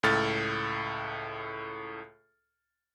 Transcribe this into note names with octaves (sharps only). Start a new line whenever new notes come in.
C#2 A2 A4 F6 A6